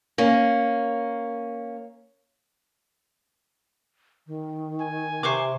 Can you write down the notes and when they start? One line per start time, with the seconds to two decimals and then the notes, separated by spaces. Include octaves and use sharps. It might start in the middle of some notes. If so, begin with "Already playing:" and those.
0.18 A#3 C#4
4.27 D#3
4.81 G#5
5.23 C3 C5 C#6 D6